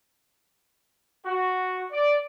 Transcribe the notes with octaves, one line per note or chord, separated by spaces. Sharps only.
F#4
D5